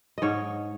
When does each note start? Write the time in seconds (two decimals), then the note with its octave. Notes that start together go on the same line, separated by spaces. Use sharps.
0.18 G#2 C#5 D#5